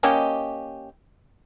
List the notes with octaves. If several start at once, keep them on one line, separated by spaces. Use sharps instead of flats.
A#3 C#4 G4 D#5